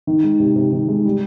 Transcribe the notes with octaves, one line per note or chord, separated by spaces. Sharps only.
D#3
G#3
C3
C3
D#3
G#3
G3